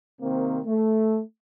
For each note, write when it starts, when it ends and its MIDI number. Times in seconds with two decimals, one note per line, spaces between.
0.21 0.60 48
0.21 0.60 51
0.21 0.60 58
0.21 0.60 60
0.65 1.21 57